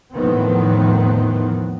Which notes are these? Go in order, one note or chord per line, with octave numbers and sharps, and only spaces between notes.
E2 A2 D#3 F3 B3 C4